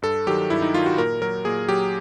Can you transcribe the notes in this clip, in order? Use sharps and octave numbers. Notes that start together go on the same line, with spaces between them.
G2 A4
D#3 F#3 G4
G2 E4
D#4
D#3 F#3 F4
F#4
A#2 A#4
F#3 A#4
A#2 G#4
F#3 G4